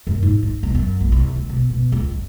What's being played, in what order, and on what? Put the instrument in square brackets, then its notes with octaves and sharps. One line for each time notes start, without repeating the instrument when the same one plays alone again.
[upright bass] F#2
G#2
D#4
B1
F#2
A#1
C2
C2
B2
B2
C#2
G2